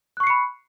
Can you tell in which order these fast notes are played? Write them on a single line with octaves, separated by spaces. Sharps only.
F#6 C#6 C7 C#7 B5